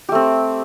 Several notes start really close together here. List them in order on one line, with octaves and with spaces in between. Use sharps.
G4 A3 C4